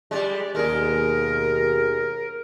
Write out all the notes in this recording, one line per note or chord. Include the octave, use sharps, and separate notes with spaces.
G3 G#3 D5
D#2 B2 G#3 G#4 A#4